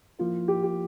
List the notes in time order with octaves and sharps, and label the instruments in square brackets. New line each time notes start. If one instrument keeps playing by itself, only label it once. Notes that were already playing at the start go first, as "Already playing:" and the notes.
[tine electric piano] F3 A#3 E4 A#4 [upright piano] F4
[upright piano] G4
G4